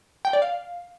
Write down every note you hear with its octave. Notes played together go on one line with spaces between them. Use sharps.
G5
D5
F5